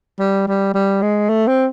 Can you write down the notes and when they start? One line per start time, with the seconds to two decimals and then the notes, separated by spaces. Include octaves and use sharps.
0.19 G3
0.47 G3
0.74 G3
1.02 G#3
1.29 A3
1.47 C4